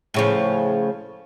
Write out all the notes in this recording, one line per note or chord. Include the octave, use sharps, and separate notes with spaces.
A2 C#3 F3